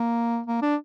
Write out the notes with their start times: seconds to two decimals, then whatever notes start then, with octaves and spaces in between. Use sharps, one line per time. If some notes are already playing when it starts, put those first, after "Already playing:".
Already playing: A#3
0.47 A#3
0.62 D4